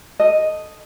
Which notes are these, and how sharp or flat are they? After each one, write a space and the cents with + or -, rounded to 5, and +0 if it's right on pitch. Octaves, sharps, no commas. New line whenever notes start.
A4 +0 D#5 +0